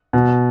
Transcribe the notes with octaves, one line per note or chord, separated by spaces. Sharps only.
B2